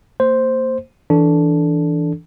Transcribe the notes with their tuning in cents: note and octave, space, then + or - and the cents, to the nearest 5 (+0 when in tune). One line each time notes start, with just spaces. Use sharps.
A#3 -30 C5 +0
E3 -5 D4 -10 A4 +0